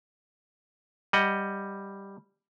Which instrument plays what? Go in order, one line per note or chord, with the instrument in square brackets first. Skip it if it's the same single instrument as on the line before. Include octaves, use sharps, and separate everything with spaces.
[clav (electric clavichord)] G3 D#5 F#5